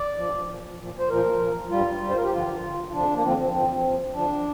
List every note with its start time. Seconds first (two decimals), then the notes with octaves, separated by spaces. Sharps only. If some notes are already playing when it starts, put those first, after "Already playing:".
Already playing: D5
0.17 G2 F3
0.48 A#2 F3
0.79 A#2 F3
0.99 C5
1.09 A#2 F3 A#4
1.40 A#2 F3
1.70 G2 G3 F4
2.01 G2 G3
2.10 C5
2.16 A#4
2.24 G4
2.31 G2 D3 F3 F4
2.62 G2 D3 F3
2.88 F4
2.93 F2 D3 F3 D4
3.14 A#3
3.23 F2 D3 F3 C4
3.38 C4
3.53 G2 F3 C4
3.84 G2 F3
4.14 F2 D3 F3 D4